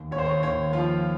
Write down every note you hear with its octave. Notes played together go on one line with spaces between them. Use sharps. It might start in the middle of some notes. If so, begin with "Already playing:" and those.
Already playing: D#2
D#2 C#5
C5
C#5
D#2 C#5
F3 F4